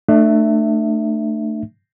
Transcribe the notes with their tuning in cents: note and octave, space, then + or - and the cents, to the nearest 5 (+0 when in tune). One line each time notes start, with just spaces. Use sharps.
A3 +10 D4 +35 E5 +0